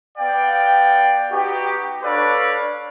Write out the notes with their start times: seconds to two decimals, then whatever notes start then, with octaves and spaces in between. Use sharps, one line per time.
0.18 B3 D5 F5 G5
1.32 B3 D#4 F#4 G4
2.04 D4 A4 B4 C#5 D5 F5